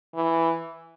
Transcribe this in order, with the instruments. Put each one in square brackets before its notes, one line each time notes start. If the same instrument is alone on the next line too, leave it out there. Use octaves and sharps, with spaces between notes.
[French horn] E3